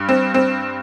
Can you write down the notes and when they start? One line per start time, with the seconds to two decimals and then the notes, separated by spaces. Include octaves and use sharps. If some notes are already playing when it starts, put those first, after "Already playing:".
Already playing: G2
0.09 C4
0.34 C4